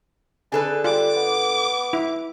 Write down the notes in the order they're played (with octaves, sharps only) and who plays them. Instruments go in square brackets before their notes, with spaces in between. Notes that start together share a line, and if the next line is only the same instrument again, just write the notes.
[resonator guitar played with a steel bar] D3 A4 B4 [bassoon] G#4
[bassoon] G3 [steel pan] F4 [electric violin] D6
[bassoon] B3
[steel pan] E4